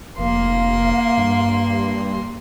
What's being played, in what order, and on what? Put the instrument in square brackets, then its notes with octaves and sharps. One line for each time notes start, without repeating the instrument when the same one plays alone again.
[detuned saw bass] F1 [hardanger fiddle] A#3 C6 [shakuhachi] F5
[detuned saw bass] G2